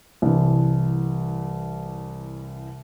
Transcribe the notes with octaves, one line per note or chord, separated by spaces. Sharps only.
C2 E3